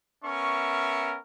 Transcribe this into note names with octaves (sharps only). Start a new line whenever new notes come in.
B3 C#4 A#4 E5 C#6